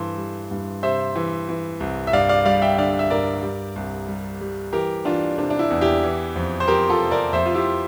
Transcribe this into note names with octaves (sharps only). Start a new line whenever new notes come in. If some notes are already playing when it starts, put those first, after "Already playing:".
Already playing: G2 E3 A4 C5
G3
G2
C3 C5 E5
E3
E3
C2
E5
G2 D5 F5
D5 F5
G3 D5 F5
E5 G5
D3 D5 F5
E5
G2 A#4 D5
G3
C2
G3
G3
E3 G4 A#4
E3 D4 F4
C3 D4
D4
E4
E2
E4 G4
E3
F2
C5
F2 G4 A#4
F4 A4
C3
A#4 D5
F2 C5 E5
F4
E4 G4